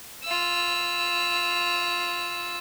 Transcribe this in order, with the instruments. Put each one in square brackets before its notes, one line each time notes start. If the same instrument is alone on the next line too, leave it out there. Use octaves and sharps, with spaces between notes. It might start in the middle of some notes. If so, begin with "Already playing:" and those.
[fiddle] F4 E6